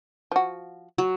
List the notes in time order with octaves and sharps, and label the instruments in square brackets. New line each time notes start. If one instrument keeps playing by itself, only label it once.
[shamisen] F3 F#4
[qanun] F#3